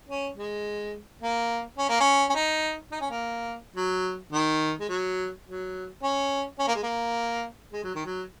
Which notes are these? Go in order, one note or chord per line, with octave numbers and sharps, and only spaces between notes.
C#4
G#3
A#3
C#4
A#3
C#4
C#4
D#4
D#4
C#4
A#3
F#3
D#3
G#3
F#3
F#3
C#4
C#4
A#3
G#3
A#3
G#3
F#3
D#3
F#3